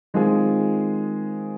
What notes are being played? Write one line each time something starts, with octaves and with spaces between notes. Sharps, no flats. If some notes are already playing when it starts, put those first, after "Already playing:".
D#3 G#3 C4 F4 G#4